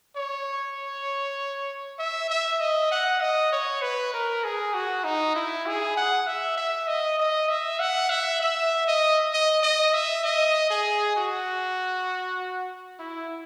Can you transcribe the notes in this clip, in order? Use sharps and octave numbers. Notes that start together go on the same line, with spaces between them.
C#5
E5
E5
D#5
F#5
D#5
C#5
B4
A#4
G#4
F#4
D#4
E4
G#4
F#5
E5
E5
D#5
D#5
E5
F#5
E5
E5
D#5
D#5
D#5
E5
D#5
G#4
F#4
E4